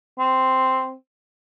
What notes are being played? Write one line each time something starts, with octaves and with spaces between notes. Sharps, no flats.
C4